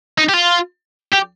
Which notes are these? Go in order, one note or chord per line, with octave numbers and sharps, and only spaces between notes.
D#4
G4
F4
G4